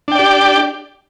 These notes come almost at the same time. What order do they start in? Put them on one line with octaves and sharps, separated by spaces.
D4 G5 D5 G4